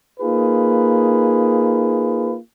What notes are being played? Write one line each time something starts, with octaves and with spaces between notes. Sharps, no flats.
A#3 D#4 F4 G#4 B4